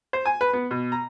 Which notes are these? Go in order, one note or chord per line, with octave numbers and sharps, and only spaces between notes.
C5
G#5
B4
B3
B2
A#5